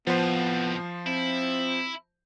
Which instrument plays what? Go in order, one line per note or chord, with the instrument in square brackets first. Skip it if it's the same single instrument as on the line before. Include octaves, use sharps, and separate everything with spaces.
[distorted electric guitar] F2 A2 [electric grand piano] F3 C5 [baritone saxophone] B3
[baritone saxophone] C4 [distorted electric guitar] E4